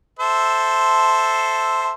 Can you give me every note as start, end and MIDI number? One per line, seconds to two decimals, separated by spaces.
0.19 1.92 69
0.19 1.92 72
0.19 1.92 76